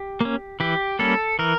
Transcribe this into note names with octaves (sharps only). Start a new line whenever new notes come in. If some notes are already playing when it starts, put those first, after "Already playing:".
Already playing: G4
A#3 C#4
E3 G4
G3 A#3 C#4 A4
E3 A#4